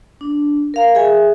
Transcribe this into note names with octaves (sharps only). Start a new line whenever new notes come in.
D4
A#4 F5 A#5
G#4 E5 G#5